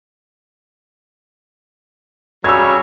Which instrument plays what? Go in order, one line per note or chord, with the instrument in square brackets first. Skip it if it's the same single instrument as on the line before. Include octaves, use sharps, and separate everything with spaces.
[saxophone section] C#3 F#3 G3 [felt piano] E6 G#6